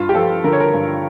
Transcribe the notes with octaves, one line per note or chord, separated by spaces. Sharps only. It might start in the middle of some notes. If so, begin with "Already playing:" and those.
Already playing: G2 F4
G4
F3 A4
D3 A#4
C#5
A#4
G2